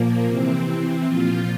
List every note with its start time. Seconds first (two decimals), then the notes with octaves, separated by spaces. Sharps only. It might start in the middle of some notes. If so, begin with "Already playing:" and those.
Already playing: A#2 F3 A#3
0.26 C3 E3 C4
1.05 A#2 F3 F4